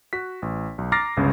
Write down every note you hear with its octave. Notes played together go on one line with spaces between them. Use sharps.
F#4 B6
A1
B1
A#5 D6 F6 A6 A#6 C7
G1 C#2 C#3